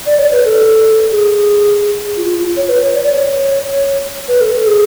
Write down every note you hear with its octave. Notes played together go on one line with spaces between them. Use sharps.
D5
C#5
B4
A4
G#4
F4
F4
C#5
B4
C#5
D5
C#5
B4
A4
A4
G#4